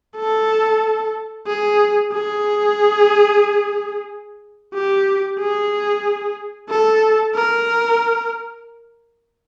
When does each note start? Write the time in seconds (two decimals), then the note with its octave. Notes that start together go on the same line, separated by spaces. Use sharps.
0.16 A4
1.47 G#4
2.13 G#4
4.74 G4
5.39 G#4
6.69 A4
7.35 A#4